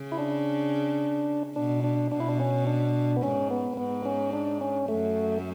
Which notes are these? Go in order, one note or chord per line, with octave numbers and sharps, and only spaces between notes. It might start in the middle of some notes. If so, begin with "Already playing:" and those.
Already playing: C#3
E4
D4
B2 D4
D4
B2 D4
E4
D4
C#4
D4
B3
G#2 C#4
B3
G#2 B3
C#4
D4
C#4
F#2 A3